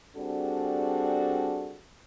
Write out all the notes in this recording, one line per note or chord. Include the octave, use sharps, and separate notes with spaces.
G3 C4 D4 F#4 G#4 A4